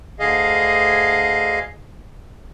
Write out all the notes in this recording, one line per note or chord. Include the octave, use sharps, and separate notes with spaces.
D2 D3 G#4 D#5 F5